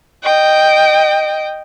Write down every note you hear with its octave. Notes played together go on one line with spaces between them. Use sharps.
D#5 G5